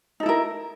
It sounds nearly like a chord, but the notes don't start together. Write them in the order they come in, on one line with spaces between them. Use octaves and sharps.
D#4 A4 E4 A#4